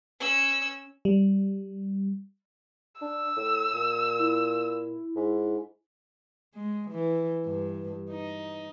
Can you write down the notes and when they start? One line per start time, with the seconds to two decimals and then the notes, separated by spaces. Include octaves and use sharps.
0.20 C#4 E6
1.05 G3
3.01 D4 E6
3.36 A2
3.74 A#2
4.19 E4
5.16 G#2
6.55 G#3
6.91 E3
7.45 G2
8.11 D#4